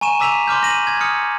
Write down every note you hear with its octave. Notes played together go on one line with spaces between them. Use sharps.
G#5 A#5 C#6 D#7 E7
A#5 D6 E6 B6 D#7 F7
C6 D6 F6 G6
A#6 D#7 F#7
G#6
D#6 F6 C#7